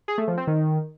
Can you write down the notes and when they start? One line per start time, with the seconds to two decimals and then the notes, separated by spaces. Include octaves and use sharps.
0.08 G#4
0.18 A3
0.28 F3
0.37 C4
0.47 D#3